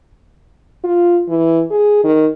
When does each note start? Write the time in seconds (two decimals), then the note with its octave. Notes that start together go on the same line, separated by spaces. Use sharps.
0.84 F4
1.29 E3
1.70 G#4
2.04 D#3